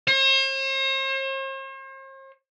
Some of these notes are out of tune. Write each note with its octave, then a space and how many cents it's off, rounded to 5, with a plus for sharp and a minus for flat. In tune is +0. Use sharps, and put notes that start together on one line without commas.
C5 +45